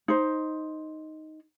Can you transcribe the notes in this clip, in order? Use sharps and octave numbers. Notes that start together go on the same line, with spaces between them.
D#4 C5